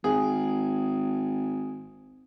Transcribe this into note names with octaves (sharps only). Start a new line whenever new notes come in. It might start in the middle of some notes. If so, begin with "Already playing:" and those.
G#1 G#4